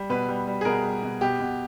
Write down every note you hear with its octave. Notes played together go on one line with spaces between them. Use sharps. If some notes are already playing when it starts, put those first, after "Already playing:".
Already playing: G3
B2 B4
G3
G3
G#4
B2 A#4
G3
B2
B2 G4
B2